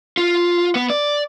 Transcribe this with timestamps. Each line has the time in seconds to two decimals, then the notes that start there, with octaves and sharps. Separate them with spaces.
0.17 F4
0.75 B3
0.90 D5